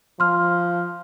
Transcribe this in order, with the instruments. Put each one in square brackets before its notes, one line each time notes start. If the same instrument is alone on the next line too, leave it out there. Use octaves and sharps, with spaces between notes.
[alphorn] F3 [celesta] C6 F6